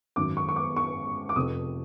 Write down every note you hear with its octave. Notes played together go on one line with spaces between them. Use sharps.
G#1 F#2 D#3 F#3 D6
C#6
C#6
D6
C#6
D6
F1 F2 C3 D#6